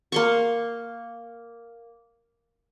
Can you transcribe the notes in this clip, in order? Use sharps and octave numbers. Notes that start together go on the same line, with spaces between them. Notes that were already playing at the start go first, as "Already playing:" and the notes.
A#3 C6 C#6